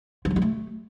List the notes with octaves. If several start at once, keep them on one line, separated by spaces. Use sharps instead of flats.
F3
F#3
G3
A3